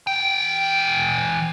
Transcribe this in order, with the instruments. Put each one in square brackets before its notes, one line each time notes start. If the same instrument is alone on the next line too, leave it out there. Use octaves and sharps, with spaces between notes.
[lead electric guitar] E3 G5